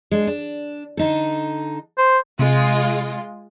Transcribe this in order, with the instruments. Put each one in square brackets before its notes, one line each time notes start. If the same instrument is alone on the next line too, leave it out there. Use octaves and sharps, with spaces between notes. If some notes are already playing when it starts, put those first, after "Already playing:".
[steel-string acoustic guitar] G#3 D4
D4
D3 D#4 A4
[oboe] C5
[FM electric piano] C3 [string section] G#3 F4